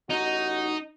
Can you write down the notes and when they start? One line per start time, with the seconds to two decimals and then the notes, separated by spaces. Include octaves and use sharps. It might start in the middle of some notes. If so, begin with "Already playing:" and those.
0.10 A1 D#4 F#4